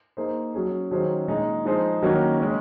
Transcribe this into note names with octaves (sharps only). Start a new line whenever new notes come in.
A#3 D#4 G#4 C5
F#3 C#4 G#4
D#3 F#3 C#4 G#4 C5
A#2 G#3 D#4 G#4
F3 G#3 D#4 G#4 C5
D#3 F#3 A#3 C#4 F#4
C#3 G#3 C#4